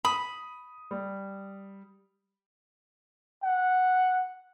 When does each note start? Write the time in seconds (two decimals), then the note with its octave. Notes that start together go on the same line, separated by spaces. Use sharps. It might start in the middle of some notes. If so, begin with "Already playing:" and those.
0.05 B5 D#6
0.91 G3
3.43 F#5